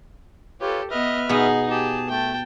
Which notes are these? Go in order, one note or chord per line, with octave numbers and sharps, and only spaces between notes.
F4 G4 A4 B4 C#5
B3 B4 D#5 E5 F6
B2 B3 D#4 G#4
G4 G#4 A5
A3 G5 A5